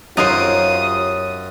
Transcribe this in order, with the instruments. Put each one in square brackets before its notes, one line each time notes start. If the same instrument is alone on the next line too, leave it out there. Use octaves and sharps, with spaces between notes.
[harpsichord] F#2 [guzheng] D#4 A#4 C5 [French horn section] F4 G4 C#5 [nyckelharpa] D#6